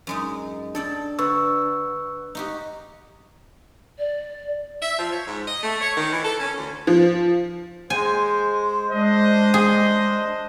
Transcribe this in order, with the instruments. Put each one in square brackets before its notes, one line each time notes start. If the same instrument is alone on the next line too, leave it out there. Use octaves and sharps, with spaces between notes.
[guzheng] F#2 G#3 D#4
[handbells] D4 [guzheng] A4 D5 G5
[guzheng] D3 [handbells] B4 C#6 E6
[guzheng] D#4 F#4 G4
[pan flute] D5
[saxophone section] E5
F3
C#5
G#2
D#5
A3
C#5
D#3
E3
A4
C#4
D2
[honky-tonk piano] F3
[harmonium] G#3 C5 [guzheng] G#5
[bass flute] G#3 [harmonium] D4 [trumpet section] C5 D#5
[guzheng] G#4